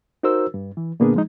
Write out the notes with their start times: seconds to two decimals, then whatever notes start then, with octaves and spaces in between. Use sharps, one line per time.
0.23 D#4 F#4 A#4 C5 E6
0.54 G2
0.77 E3
1.00 A#2 D3 A#3 B3 D4 G#4
1.14 F3 G#3 D#4